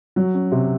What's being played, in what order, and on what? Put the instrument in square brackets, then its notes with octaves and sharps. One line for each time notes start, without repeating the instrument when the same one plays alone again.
[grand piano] F#3
C#4
C3